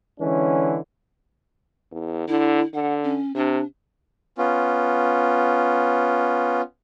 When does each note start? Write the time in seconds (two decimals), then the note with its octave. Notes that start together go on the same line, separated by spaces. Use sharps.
0.20 D3 E3 G#3 C#4
1.92 E2
2.28 D3 E4
2.74 D3 F#5
3.04 C#4
3.35 C3 D4
4.38 B3 C#4 F4